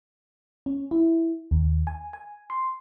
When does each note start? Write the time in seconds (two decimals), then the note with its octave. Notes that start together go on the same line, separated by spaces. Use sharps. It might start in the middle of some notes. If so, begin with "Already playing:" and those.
0.66 C#4
0.91 E4
1.51 D#2
1.87 G#5
2.13 G#5
2.50 C6